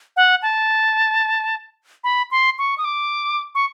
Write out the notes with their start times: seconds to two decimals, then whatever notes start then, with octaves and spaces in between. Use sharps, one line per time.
0.16 F#5
0.42 A5
2.04 B5
2.31 C6
2.59 C#6
2.78 D#6
2.85 D6
3.55 C#6